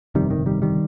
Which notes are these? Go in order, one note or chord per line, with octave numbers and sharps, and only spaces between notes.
G1 F2 C3 D#3 G3
D#3
D#3 G3
D#3 G3